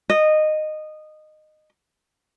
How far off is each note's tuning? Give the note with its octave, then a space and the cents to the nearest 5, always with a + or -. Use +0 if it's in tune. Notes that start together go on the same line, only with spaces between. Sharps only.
D#5 -15